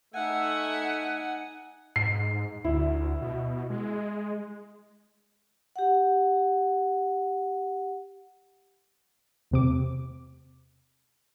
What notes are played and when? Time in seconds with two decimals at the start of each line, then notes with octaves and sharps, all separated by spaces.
0.14 A3 D#4 E5 F#5 G#5
1.96 G#2 C7
2.65 D2 E4
3.21 B2
3.70 G#3
5.76 G4 F#5
9.51 E2 C3 D6